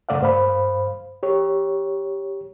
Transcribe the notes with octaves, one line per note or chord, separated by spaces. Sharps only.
F#2 C#3 A3 D5 F5 F#5
G2 C5 F5 B5
G4 C#5